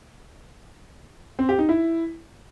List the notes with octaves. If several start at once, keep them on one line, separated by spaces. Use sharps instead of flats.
C4
G4
D#4
E4